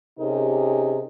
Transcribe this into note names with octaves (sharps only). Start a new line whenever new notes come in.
C3 C#4 D#4 G4 G#4 A#4